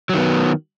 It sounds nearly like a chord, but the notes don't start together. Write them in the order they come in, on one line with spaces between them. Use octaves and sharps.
F#3 D#3 B3